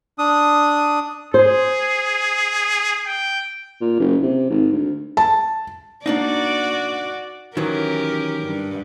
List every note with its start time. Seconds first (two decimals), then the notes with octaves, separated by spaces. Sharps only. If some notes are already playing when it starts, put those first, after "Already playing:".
0.19 D4 D#6
1.34 G#4 C5
3.07 G5
3.81 A#2
3.99 F#1
4.23 C3
4.50 G#1
4.72 D2
5.17 A5
6.06 A#3 D4 D#4 F#4 D5
7.57 D#3 E3 F#3 C#4 G4 A#4
8.46 G2